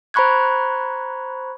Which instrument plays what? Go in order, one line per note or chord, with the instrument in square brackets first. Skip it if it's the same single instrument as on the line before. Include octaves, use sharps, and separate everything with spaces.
[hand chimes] C5 A#5 B5 C#6 F#6 G#6